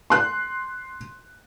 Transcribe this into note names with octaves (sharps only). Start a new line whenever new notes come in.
C6 F#6